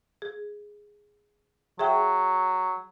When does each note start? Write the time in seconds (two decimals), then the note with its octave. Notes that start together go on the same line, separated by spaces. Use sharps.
0.22 G#4
1.79 F#3 G#4 E5 G5